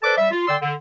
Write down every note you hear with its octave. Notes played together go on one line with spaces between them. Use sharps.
A4 B4 C5 D5 A5 D6
G3 E5
F4
D3 D5 G5 C6 E6
D3